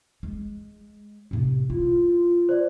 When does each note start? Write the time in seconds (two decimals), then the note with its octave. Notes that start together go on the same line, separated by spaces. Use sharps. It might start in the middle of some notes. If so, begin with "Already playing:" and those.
0.23 G#3
1.31 A2 C3
1.70 E4 F4
2.49 C5 D5